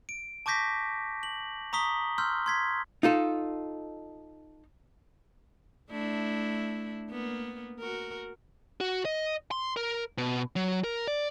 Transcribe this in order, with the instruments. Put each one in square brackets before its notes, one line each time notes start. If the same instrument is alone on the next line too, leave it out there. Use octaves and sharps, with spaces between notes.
[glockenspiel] D7
A5 C#6 D6 G6 A#6 B6
F#7
A#5 C#6 D#6 B6 G7
C6 E6 F6 G6
C6 G#6 B6
[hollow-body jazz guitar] D#4 F4 A4
[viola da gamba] A3 D4 E4
A#3 B3
F#4 A#4
[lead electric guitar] F#4
D#5
C6
A#4
B2
F#3
A#4
D5